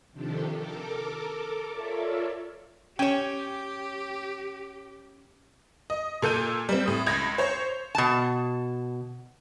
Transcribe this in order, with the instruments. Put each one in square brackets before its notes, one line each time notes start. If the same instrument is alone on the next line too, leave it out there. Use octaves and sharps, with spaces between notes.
[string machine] C3 D#3 F3 D4 G4 A4
A4 A#4 D6
F4 A4 A#4 C#5 D5 E5
[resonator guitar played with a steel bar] C#4 C#5 [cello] G4 [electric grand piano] G5 E7
[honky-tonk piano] D#5
A#2 A4 G6 D#7
G3 C4
A2 D#6
C#2 G#6 A#6
C5 C#5
[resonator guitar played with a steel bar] B2 A5